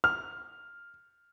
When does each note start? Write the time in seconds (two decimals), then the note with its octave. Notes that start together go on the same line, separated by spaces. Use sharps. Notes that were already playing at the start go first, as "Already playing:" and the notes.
0.04 F6